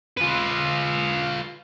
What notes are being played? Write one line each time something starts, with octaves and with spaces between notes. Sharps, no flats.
F4 B4